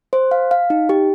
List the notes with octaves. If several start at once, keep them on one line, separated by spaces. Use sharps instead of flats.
C5
F5
F5
D#4
G4